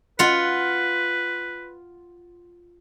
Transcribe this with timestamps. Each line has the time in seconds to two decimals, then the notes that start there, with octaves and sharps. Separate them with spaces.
0.19 F4 B4 F#5